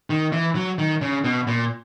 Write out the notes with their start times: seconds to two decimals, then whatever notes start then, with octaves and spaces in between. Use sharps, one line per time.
0.10 D#3
0.33 E3
0.55 F#3
0.79 D#3
1.02 C#3
1.24 B2
1.47 A#2